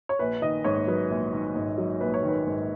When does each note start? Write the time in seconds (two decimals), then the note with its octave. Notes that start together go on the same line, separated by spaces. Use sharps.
0.09 C#5
0.19 A#1 B4
0.42 D#3 D#5
0.64 G#2 C#5
0.87 F#3 B4
1.10 A#1
1.33 D#3
1.56 G#2
1.78 F#3
2.01 A#1 B4
2.14 C#5
2.23 D#3
2.28 B4
2.47 G#2